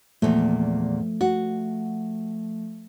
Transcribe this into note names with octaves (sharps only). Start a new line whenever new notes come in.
E2 A#2 F3 A3
F#4